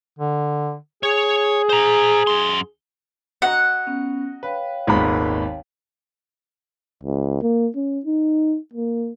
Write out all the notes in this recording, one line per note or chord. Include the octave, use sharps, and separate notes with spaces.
D3
G#4 C#5
C5 A#5
F#2 C6
F#4 D#5 F#5 A#5
B3 C#4
B4 C#5 F5 G5
G#1 D#2 A#2 G#3 B3 B5
C#2
A#3
C#4
D#4
A#3